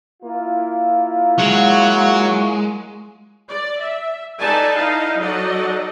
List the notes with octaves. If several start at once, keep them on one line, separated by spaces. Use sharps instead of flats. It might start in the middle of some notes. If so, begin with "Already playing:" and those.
A#3 E4 F4
F#3 G#3 F#4
D5
E5
D#4 A4 B4 D5 G#5 A5
D#4 E4 D#5 F5
F#3 D#4 A4 D5 D#5 F#5